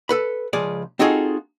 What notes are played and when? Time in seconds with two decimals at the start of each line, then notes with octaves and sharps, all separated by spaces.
0.09 A4 B4 B5
0.53 C#2 F3 G#4 D5
0.99 C4 D#4 F4 F#4 G#4 A4